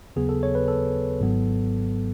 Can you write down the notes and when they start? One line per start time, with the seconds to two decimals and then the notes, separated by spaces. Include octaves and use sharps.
0.16 D#2 C#3 F#3 B3 G#4
0.29 A4
0.43 C#5
0.55 B4
0.68 A4
1.20 G#1 G#2 F#3 B3